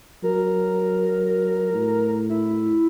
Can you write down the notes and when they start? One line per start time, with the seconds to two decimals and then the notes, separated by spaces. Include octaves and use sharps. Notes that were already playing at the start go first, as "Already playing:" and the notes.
0.23 F#3 A#4
1.74 A2
2.29 E4